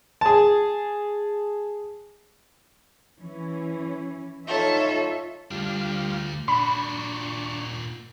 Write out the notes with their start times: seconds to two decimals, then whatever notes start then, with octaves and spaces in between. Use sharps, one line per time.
0.21 G#4 A5
3.20 E3 C#4
4.47 D#4 F4 A4 C#5 E5
5.51 D2 G3 D4 F4
6.48 A#2 D4 F#4 B5 C#6